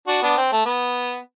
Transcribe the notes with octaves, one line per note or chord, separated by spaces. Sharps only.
D4 F#4
B3 D4
C4
A3
B3